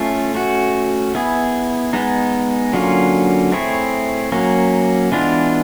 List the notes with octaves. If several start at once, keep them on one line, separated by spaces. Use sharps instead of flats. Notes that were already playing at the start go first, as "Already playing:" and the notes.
Already playing: A3 C#4 F4 A4
A3 C#4 F#4
B3 E4 G#4
G#3 B3 D#4
D3 F#3 A#3 C#4 F4
A3 C4 E4 G#4 C#5
F#3 A#3 C#4
E3 G#3 B3 D4 F4